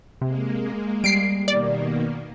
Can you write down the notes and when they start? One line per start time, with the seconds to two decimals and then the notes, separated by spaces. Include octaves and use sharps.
0.21 C3 G#3 A#3
1.04 G3 C7 D7
1.48 B2 D#3 A#3 D5